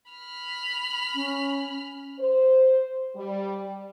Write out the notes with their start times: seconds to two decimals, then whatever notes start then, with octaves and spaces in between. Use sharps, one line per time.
0.12 B5 F6
1.14 C#4
2.20 C5
3.16 G3